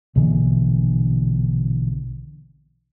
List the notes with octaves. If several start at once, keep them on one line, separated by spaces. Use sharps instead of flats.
A#1 B2 D3 E3